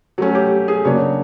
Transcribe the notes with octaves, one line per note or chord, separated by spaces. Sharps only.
F#3 A3 C#4
G4
G#4
C#3 F#3 A#3 D4 C#5